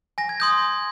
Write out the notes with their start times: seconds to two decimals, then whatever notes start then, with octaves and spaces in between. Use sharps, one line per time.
0.18 G#5 A#6
0.29 G#6
0.40 C6 D#6 G6